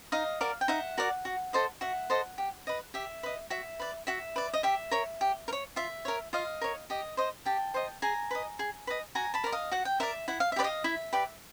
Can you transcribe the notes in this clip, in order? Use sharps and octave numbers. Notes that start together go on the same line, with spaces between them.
D#4 D#5 F5
F#4 A#4 D5
G5
D#4 E5 F#5
F#4 A#4 D5
F#4
A4 C5 D#5
F#4 E5 F#5
A4 C5 D#5
G4
B4 D#5
G4 E5
B4 D#5
F#4 E5
B4 D5
F#4 E5
B4 D5
D#5
G4 E5
A#4 C#5
G4
A#4
C#5
F4 E5
A#4 C#5
F4 D#5 F5
A#4 C#5
G4 D#5
C5 D#5
G4 G5 A5
C5 D#5
G#4 G#5 A#5
B4 D#5
G#4
B4 D#5
F#4 G#5 A#5
A5 B5
A#4 D5
D#5 F5
F#4 F#5
G5
A#4 D5 E5 F#5
E4 F#5
F5
E5
G4 B4 D5
D#5 F5
E4 E5
G4 B4 D5